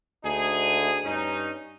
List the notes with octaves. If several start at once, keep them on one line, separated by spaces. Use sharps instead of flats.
D2 D#4 G#4
G2 C#4 D#4